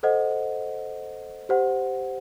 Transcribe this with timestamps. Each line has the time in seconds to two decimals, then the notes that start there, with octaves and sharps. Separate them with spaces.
0.03 A4 C5 D#5 F#5
1.49 G4 C5 F#5